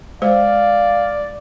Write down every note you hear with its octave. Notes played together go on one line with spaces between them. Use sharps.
G#3 C5 D5 F5